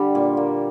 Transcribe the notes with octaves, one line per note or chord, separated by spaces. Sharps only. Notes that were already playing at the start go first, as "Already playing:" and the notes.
Already playing: D3 G3 G4
A#2
A#3